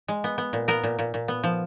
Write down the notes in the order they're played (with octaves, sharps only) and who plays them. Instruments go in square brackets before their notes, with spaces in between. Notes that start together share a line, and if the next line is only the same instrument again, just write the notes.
[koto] G#3
B3
B3
A#2
B3 A#4
A#2
A#2
A#2
B3
F3